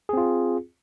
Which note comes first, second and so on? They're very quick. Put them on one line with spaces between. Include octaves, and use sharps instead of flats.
G#4 C4 F4